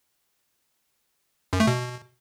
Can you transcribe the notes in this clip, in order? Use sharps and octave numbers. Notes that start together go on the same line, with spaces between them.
F#2
A3
B2